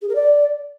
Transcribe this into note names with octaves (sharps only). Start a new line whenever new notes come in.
G#4
A#4
D5